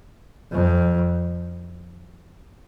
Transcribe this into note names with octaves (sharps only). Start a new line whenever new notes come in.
F2